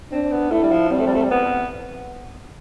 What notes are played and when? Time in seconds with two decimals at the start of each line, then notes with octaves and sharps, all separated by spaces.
0.12 C4 D4
0.31 B3
0.51 A3 E4
0.63 G3
0.71 F3
0.91 G3 C4
0.99 A3
1.07 G3
1.15 A3
1.22 G3
1.31 B3